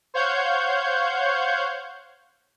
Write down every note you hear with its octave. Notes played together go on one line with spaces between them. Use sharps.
C5 C#5 F5 F#5 G6 G#6